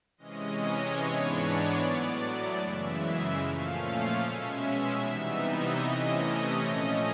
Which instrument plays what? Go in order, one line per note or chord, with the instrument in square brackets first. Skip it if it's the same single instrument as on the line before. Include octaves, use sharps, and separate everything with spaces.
[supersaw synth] C3 E3 G#3 C#4 D#5
C#5
G#2 E3 G#3 B3 D4
D5
A2 F#3 B3
F#2 C#3 E3 G#3 E5
A#2 F3 A3 C#4 F5
B2 G#3 C#4 E5
C3 E3 G3 B3 D#4
D#5
C3 E3 A3 C#4
D#5
A#2 F3 A3 C#4